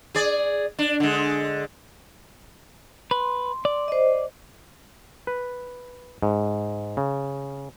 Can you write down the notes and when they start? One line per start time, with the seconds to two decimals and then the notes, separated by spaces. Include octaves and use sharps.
0.15 G#4 D5
0.79 D4
1.00 D3 G#3
3.11 B4 C6
3.65 D5
3.88 C5 D#5
5.27 B4
6.23 G#2
6.97 C#3